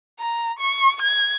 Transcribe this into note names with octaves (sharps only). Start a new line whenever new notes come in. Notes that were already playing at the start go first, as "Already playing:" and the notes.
A#5
C#6
G#6